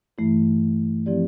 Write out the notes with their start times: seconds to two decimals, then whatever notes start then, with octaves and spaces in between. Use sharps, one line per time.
0.18 G2 E3 A3 E4
1.06 F3 C4 E4 G4 D5